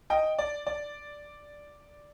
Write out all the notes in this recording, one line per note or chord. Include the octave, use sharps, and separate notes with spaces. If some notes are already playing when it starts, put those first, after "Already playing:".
D#5 G5
D5
D5